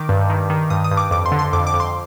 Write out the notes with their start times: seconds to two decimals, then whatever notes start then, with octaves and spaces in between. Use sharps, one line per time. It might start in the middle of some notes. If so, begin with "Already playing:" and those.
Already playing: D#3 D6
0.09 G2
0.30 D#3
0.50 D#3
0.70 G2 D#6
0.84 D#6
0.91 G2
0.97 D6
1.11 F2 D6
1.26 C6
1.32 D3
1.39 C6
1.53 F2 D6
1.67 D6
1.73 F2
1.80 C6